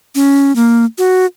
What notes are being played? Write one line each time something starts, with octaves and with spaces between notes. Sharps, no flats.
C#4
A#3
F#4